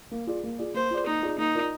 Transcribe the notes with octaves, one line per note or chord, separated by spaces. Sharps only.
A#3
F4 G#4 D5
A#3
F4 G#4 D5
A#3 C5
F4 G#4 D5
A#3 D#4
F4 G#4 D5
A#3 D#4
F4 A#4 D5